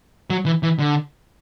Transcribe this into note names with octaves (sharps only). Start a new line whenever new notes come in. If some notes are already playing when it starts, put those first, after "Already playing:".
F#3
E3
E3
D3